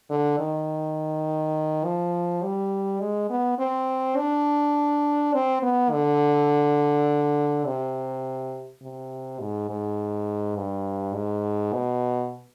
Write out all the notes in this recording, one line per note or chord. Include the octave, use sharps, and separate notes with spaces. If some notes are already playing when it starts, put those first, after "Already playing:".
D3
D#3
F3
G3
G#3
B3
C4
D4
C4
B3
D3
C3
C3
G#2
G#2
G2
G#2
B2